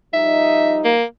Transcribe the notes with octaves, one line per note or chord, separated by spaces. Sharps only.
F3 G3 D#4 E5
A#3